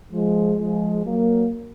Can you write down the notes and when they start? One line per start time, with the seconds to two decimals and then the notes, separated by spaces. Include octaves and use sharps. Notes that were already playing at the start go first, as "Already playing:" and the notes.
0.12 F3 G#3
0.58 F3 G#3
1.05 F#3 A#3